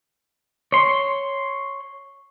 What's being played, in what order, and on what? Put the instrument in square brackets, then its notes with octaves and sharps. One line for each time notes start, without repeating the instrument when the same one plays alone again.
[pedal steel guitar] C#5 C6